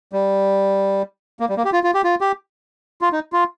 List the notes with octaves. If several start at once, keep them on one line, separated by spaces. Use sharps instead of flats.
G3
A#3
G3
A#3
G4
F4
F4
G4
F4
G4
F4
D#4
F4